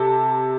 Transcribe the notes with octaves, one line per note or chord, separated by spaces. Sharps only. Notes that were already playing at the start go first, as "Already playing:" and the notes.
Already playing: C3 A4